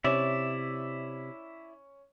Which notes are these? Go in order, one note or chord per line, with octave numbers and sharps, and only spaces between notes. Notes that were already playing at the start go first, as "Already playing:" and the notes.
C3 C#4 E4 D5 E5